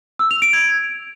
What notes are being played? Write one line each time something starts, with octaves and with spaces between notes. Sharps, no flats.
E6
F7
D7
G#6